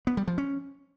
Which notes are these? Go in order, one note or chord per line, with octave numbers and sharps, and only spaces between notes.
B3
G3
F3
C#4